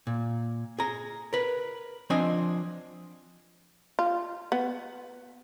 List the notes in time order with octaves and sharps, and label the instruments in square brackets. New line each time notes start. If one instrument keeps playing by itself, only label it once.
[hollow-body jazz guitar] A#2
G#4 A#5
A#4 B4
F3 C4 D4 D#5 G#5
[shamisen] F4
B3